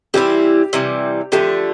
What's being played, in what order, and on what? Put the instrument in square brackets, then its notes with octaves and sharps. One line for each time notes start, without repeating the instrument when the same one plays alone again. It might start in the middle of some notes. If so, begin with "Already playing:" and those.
[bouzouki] E3 G3 C4 E4 [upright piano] G4
[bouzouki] C3 E3 G3
[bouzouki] D3 F3 A3 [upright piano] G4